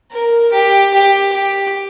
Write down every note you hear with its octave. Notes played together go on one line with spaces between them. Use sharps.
A#4
G4
G4
G4